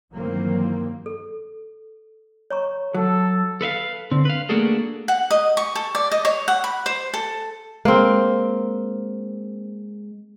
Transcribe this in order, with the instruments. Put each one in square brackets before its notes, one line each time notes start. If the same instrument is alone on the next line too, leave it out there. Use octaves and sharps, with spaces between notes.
[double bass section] G2 D#3 E3 F#3 A#3 C4
[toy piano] A4
C#5 A#5 C#6
[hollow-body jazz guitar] F#3 [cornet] A4
[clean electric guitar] A4 B4 E5 F5
D3 C4
B4 F5
A3 A#3 D4 F#4 G#4 A4
[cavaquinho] F#5
D#5
C#6
A4
D5
D#5
C#5
F#5
B5
C5
A4
[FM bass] G#3 [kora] A#3 C4